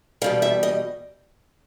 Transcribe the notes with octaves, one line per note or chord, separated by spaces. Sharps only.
E2 B2 G3 F5
E5
D#5